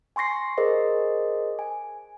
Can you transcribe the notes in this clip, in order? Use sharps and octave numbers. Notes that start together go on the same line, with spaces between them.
G#5 C6 C#6 A#6 C7
G#4 A#4 C5 D#5
G#5